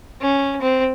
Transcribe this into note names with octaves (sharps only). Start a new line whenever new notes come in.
C#4
C4